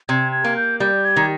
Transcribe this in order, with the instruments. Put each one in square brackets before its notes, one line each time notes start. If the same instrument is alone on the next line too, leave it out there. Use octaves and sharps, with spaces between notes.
[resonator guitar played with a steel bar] C3 [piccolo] G#6
[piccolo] G#6
[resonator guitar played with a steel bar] A#3
[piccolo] G6
[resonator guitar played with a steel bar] G3 [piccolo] G6
[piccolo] G#6
[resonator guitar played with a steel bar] D#3